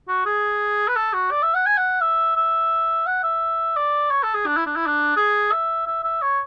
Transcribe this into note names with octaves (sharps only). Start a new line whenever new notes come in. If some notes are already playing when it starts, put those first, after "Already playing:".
F#4
G#4
B4
A4
F#4
D5
E5
F#5
G#5
F#5
E5
E5
F#5
E5
D5
C#5
A4
G#4
D4
E4
D4
E4
D4
G#4
E5
E5
E5
C#5